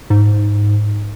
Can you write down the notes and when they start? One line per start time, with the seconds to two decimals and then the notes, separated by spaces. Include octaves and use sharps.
0.10 G#2